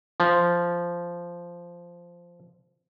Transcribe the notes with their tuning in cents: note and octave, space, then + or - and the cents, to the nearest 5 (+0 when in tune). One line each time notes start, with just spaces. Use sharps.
F3 -10